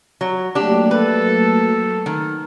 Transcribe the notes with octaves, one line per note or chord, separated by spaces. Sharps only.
F#3
F#3 A3 A#3 D4 G4
A4 B4
D#3